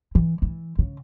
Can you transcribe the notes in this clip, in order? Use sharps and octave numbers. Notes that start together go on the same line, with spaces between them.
E3
E3
C#3